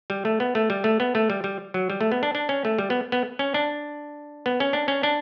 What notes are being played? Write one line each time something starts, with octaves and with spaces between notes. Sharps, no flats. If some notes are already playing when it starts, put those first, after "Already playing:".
G3
A3
B3
A3
G3
A3
B3
A3
G3
G3
F#3
G3
A3
B3
D4
D4
C#4
A3
G3
B3
B3
C#4
D4
B3
C#4
D4
C#4
D4